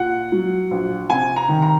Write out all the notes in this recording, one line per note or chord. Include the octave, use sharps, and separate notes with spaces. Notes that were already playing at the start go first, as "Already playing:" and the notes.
Already playing: A#2 F#5
F#3
A#1
C3 G#5
A#5
D#3
A#5